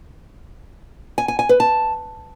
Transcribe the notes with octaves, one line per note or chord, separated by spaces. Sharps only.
G#5
G#5
G#5
B4
A5